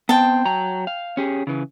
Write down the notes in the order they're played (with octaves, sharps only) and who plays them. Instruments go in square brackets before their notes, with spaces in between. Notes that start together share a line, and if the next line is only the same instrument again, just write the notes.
[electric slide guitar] B3 C4 [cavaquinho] G5 A5
[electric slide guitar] F#3 A#5
F5
C#4 G4 G#4
C#3 E3